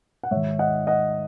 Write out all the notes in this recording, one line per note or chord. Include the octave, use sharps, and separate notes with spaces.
F#5
G#2 D#3 C#5 E5
D#5 F#5
D#5 F#5